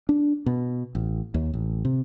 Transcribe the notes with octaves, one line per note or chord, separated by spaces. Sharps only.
D4
B2
A1
D#2
A1
C3